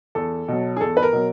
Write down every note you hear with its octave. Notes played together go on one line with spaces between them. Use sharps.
E2 A4
B2 F#3
G#4
E2 A4
B4
A#4
B2 F#3